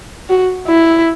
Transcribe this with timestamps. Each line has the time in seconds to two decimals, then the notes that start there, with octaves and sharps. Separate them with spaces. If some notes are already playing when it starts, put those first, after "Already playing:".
0.29 F#4
0.67 E4